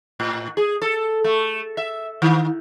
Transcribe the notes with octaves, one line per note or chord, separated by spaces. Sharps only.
A2
G#4
A4
A3
E5
D#3